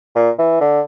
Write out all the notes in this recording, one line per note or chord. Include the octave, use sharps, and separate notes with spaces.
A#2
E3
D3